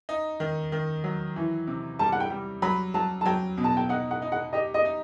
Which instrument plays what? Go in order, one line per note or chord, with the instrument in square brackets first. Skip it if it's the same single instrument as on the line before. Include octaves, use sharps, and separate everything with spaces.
[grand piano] D#4
D#3
D#3
F#3
E3
C3
[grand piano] G3 [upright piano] A5
[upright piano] F#5
G5
[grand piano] G3
[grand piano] F#3 [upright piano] B5
[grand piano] F#3 [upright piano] A5
[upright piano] A5
[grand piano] F#3 [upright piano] G5
[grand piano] B2
[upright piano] A5
G5
[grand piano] D#4 [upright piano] F#5
[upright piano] F#5
[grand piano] D#4
[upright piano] F#5
[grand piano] G4 [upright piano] D#5
[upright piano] D#5
[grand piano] D#4